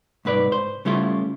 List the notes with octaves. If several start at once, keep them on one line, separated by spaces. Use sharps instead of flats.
C2 G#2 B4 D5
C5
C#3 G3 A3 E4 F4